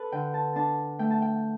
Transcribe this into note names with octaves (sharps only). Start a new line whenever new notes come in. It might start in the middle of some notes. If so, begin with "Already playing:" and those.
Already playing: A4 B4
D3 G5
A5
D4 A5
A3 G5
A5
G5